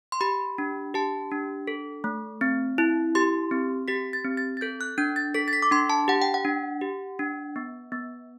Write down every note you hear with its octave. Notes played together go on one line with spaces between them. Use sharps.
C6
G4 B5
D4
G4 A5
D4
A4
A3
C4
E4
G4 C6
C4
G4 B6
A6
C4
A6
A6
A4 G6
F#6
D4 G6
A6
A4 B6
A6
B6
D6
D4 C6
A5
G4 F#5
G5
F#5
D4
G4
D4
B3
B3